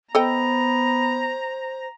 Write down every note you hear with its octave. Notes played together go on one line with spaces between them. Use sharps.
B3 A4 C5 D#5 G5 A#5